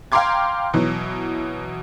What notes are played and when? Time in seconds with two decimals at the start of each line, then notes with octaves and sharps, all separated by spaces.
0.12 F5 G5 A#5 C6 D6 G#6
0.74 B2 E3 F#3